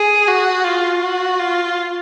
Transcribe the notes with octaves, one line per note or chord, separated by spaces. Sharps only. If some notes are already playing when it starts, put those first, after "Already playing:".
Already playing: G#4
F#4
F4
F#4
F4